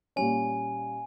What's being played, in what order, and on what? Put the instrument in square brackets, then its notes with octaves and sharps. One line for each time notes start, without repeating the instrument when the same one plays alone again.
[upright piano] A#2 G3 C#4 [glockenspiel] G#5